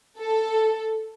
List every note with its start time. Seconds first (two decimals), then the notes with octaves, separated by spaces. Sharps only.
0.19 A4